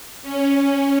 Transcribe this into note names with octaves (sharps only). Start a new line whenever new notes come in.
C#4